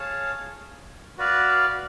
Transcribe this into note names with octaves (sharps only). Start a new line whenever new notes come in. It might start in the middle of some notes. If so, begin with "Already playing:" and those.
Already playing: G#4 C#5 F5 A5
F#4 B4 D5 F5